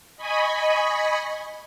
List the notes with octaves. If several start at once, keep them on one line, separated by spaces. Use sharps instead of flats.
D#5 G#5 B5 C#6